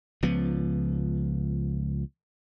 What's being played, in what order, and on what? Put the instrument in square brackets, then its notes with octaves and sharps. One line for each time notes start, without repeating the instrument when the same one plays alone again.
[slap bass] C#2 F3 B3